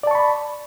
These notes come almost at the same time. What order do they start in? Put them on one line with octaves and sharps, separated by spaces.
D5 A5 C#6 B5